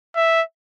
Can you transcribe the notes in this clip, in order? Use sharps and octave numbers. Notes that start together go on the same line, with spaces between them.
E5